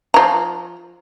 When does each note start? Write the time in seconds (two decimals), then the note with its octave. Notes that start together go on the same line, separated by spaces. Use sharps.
0.14 F3 A#5